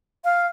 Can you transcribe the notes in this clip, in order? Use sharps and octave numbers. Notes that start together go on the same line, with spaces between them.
F5